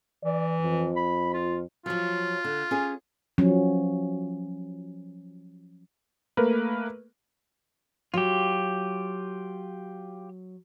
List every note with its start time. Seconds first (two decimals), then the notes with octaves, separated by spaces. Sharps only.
0.24 E3 D5
0.61 F2
0.96 B5
1.34 F4
1.86 F3 F#3 F4
2.44 D3
2.71 C#4 G#4
3.38 F3 F#3 C#4
6.37 A3 A#3 A#4 B4
8.14 F#3 F4 G4